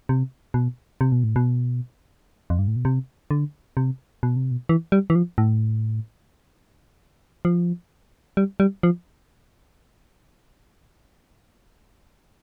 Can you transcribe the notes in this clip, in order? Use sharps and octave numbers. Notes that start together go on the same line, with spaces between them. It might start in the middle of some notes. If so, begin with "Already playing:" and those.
C3
B2
C3
B2
A2
B2
F2
G2
A2
B2
C3
D3
C3
B2
C3
B2
E3
G3
E3
F3
A2
F3
G3
G3
F3